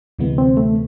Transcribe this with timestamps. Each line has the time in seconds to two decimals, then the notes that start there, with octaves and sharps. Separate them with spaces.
0.19 D2 C3 E3 G#3 B3
0.38 C4
0.57 A3